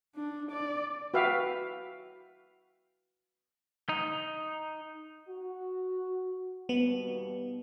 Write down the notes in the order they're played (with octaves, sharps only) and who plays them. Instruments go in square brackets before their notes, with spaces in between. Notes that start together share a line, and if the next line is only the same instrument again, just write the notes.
[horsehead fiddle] D4
D5
[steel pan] F#4 B4 E5 F5 G5
[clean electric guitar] D#4
[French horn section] F#4
[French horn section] D#2 B2 G3 [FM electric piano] B3